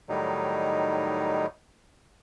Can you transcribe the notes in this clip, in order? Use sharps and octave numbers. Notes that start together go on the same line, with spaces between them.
A2 D#3 F#3 G3 D#4